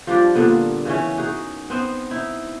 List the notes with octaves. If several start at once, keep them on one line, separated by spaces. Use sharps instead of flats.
F3 G3 D4 D5
A#2 D3 A#3 B3
C#3 E3 C#4
D#4 F#4 G#4
B3 C4 D#5
D#4 E4